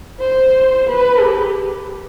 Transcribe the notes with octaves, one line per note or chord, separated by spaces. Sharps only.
C5
B4
G4